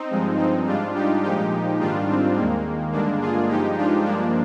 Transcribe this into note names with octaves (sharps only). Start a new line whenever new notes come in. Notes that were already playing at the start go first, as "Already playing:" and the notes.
Already playing: C4 D#4
G2 F3 G#3
C4 D#4
G#2 G3 D4 F4
D#4 G4
A#2 F3 G#3 D#4 G4
G#2 D#3 G3 D4 F4
C4
D#2 D#3 G#3 A#3
G2 D3 G#3 A#3 D4
F4 G#4
G2 F3 G#3 D#4 G4
D4 F4
G2 F3 G#3 A#3 D4